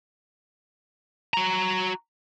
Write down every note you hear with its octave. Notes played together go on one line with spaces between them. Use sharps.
F#4 A#5